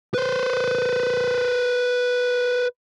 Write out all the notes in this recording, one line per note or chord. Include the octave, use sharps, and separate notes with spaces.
B4 C5